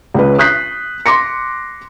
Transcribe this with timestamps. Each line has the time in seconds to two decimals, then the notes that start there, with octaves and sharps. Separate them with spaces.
0.14 C#2 C#4 B4
0.39 D#6 F#6 G6 B6 C7
1.06 C6 D6 A#6 C#7